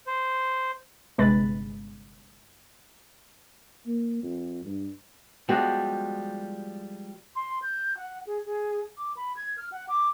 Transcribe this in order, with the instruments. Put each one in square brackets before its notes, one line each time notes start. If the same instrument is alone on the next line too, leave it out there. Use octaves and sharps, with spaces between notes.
[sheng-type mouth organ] C5
[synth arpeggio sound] G1 C3 G#3 B4 B5 A6
[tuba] A#3
F2
G2
[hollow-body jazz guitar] F3 G3 G#3 B3 F#4 G4
[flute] C6
G6
F#5
G#4
G#4
D6
B5
G#6
F6
F#5
D6